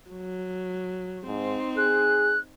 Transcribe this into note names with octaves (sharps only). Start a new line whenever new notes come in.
F#3
G#2 C4 D#4
G#4 F#6